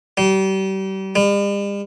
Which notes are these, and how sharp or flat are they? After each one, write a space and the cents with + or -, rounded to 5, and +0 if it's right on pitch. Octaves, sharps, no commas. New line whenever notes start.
G3 -35
G3 +45